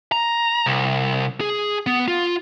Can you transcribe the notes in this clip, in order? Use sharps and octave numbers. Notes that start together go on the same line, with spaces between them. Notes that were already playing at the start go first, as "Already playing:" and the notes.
A#5
C2
G#4
B3
F4